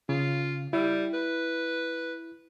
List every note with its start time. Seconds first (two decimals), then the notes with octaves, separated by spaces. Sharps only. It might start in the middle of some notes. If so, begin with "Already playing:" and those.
0.09 C#3 F4
0.73 G3 E4
1.14 B4